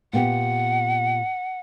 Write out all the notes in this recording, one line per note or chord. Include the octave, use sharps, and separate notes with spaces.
A#2 B3 G4 F#5